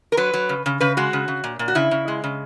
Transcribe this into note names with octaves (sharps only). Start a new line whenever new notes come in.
A#4
F#3 B4
F#3
C#3
C#3
C#3 B4
G#3 F#4
C#3
C#3
A#2
A#2
F#4
C#3 E4
C#3
G#3
C#3